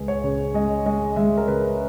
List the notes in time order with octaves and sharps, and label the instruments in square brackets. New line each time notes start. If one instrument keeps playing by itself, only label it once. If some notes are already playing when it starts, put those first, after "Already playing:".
Already playing: [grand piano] C#2 G#3 B4
C#5
C#3
G#3 D#5
G#3 D#5
G#3 E5
A#4
C#3 B4